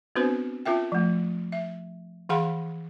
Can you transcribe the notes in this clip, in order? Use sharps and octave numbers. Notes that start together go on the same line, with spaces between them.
B3 C4 D4 F#4 B4 C5
C#4 F4 A#4 E5 G5
F3 A3
E5
E3 G#4 F5 F#5 B5 C6